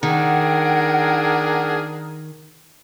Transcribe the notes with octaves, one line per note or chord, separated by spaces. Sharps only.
D#3 D4 G#4 A#4 F#5 G5